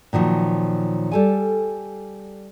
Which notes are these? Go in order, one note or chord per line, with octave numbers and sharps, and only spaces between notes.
A#2 D#3 F3 F#3
G3 A4 G#5